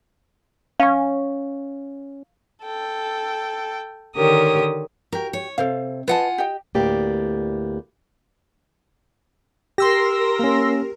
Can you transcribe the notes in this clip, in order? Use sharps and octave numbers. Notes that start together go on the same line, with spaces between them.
C#4 F5 C#6
A4 G5
D3 D#3 G4 A#4 C#5 D#6
F#4 G4 A#4
C#5
C3 A4 C5 F5
F4 B4 D#5 F#5 G#5 A5
G4 D#5 G5
D2 A2 A#3 B3 G4 D5
G4 A#4 C6 E6 A#6
A#3 C#4